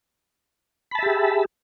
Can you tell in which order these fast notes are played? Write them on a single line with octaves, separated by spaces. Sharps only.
B5 A5 E5 G4 G#4